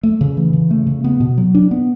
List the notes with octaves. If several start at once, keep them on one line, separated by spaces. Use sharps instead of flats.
A3
C#3
E3
C#3
A3
C#3
B3
B2
F#3
D4
B3